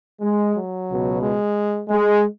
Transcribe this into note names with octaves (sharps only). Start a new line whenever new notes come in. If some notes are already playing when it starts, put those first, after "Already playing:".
G#3
F#3
C#2 B2
G#3
G#3